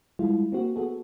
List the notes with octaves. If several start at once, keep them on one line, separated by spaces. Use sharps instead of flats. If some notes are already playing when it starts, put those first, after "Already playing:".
G3 G#3 E4 F4
A#3 C4 F#4
B3 F#4 G#4 A4